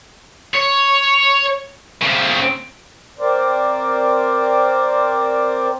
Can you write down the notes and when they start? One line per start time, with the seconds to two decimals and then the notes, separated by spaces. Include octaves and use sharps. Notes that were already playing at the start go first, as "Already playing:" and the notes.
0.54 C#5
2.02 C#3 C4
3.19 C4 A#4 C5 D5